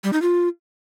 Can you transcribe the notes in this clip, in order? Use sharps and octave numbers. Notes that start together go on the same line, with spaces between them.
G3
D#4
F4